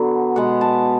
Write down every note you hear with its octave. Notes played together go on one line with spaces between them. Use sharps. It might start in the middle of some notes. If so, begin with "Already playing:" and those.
Already playing: D3 F#3 B3
B2 G#3 B3 F#5
A5